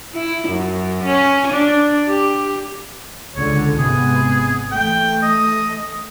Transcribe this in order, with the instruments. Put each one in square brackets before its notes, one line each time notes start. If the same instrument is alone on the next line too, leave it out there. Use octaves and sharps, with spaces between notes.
[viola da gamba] E4
F#2
C#4
D4
G4
[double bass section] C#2 D3 [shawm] C#5
[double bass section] G#1 C3 B3 [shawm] G#4
[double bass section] E3 A3 [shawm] G5
[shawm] D#5